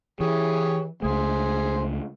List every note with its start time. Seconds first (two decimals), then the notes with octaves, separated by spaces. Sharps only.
0.20 E3 G4 G#4 C#5
1.03 C#2 A3 G#4 C5 G#5